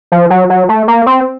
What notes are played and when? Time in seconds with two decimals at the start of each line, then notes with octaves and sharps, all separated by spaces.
0.12 F3
0.30 F#3
0.50 F#3
0.69 A3
0.88 A#3
1.06 C4